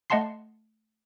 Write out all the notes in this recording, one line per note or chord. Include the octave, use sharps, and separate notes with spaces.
A3 D#5 F#5 A5 C6 C7